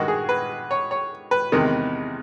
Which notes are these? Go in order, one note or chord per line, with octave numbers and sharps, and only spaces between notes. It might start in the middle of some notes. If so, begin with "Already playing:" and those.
Already playing: G2 D#3 G#3 F#4
G#4
B4
C#5
C#5
B4
E2 C3 D#3 G#3